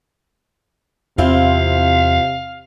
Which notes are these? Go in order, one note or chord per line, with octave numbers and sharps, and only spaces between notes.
E2 C3 C4 E4 F4 F5